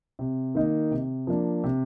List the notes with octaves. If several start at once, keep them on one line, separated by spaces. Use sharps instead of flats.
C3
D#3 A#3 D#4
C3
F3 A#3 D4
C3